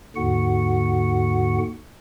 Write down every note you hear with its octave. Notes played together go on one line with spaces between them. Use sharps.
D#2 G#2 D3 F#4 F#5